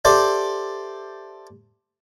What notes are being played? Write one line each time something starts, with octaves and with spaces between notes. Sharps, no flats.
G4 A4 C5 D5 E5